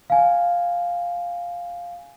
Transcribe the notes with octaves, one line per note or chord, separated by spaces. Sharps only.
F5 G#5